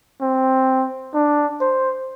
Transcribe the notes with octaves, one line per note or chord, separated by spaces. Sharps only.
C4
D4
C5